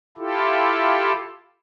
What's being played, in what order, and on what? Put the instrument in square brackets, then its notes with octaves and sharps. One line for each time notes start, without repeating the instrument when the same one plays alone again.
[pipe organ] E4 F4 G4 A4